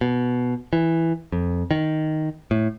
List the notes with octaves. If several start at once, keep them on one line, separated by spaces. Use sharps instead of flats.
B2
E3
F2
D#3
A2